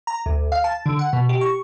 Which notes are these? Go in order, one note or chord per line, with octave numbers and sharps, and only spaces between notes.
A#5
D2
F5
A5
D3
F#5
B2
G4
C#6